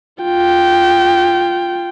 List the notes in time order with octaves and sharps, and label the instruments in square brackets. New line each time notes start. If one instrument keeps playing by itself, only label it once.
[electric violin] F4 G5